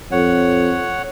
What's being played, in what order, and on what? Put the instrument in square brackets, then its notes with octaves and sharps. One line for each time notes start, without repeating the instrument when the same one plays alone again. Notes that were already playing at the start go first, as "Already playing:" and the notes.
[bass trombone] F2 [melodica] C#5 F#5